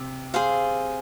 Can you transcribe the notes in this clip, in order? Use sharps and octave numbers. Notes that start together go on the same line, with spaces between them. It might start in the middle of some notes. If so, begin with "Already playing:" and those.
Already playing: C3
G#4 C5 F5